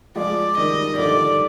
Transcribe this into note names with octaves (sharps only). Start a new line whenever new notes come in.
F3 G#3 D5
D#3 G3 D#5
G3
D3 F3 D5